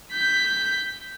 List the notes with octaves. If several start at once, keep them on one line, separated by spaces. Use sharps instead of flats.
G6 B6